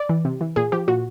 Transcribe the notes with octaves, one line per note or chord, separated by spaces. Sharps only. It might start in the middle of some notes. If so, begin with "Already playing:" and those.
Already playing: D5
E3
C3
E3
A#2 G#4
F3 G4
A#2 F#4